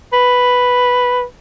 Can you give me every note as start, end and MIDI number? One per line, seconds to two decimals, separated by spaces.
0.13 1.23 71